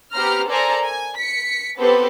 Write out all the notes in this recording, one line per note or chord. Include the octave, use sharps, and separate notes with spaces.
B3 G4 C5 A#5 F6
A4 A#4 C5 D5 G#5 A#5
G#5
B6 C#7
B3 C4 G4 A4 B4 C5